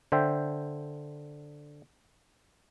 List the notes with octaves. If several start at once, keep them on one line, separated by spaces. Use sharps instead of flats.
D3 C5 E5 G5